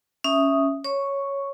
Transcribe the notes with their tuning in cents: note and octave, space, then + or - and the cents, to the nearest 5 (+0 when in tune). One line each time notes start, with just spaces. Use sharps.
C#4 +0 E5 +0 D#6 +0
C#5 +0 C#6 +0